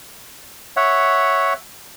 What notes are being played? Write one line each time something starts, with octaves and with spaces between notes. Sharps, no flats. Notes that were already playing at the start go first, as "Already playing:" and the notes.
C#5 E5 F#5